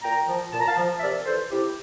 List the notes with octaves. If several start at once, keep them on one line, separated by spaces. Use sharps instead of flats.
A#2 G5 A#5
F3
A#2 A5
A#5
F5 A5
F3
E5
C3 A#4 D5
E3 A4 C5
C3 E4 G4